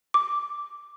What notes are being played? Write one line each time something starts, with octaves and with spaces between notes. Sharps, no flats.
D6